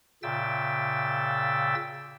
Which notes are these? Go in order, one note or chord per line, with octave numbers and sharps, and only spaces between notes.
A#2 C#3 E5 G5 E6 A6